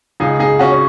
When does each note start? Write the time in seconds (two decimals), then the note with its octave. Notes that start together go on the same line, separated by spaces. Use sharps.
0.20 C#2 C#3 D#4 G#4
0.39 D#4 G#4
0.59 C#4 F#4
0.72 C#4